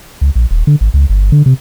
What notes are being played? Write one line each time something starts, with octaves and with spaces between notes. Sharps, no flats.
C#2
A#1
D#1
D3
G#1
C#2
G1
D3
C3